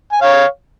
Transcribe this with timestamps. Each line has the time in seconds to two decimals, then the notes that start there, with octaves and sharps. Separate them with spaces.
0.12 G#5
0.21 C#5 F5